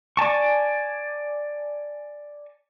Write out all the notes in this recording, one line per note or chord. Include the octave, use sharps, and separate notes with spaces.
D5 G#5 A5 C#6